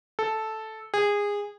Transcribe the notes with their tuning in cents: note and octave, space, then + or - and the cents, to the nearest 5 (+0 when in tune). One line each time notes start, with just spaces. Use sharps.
A4 -5
G#4 -20